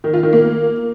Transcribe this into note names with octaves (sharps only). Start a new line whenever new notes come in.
D#3
F4
D#3
A#3